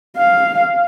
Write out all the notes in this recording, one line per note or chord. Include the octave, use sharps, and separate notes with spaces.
F5